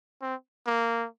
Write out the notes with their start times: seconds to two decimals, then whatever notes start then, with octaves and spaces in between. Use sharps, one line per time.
0.22 C4
0.67 A#3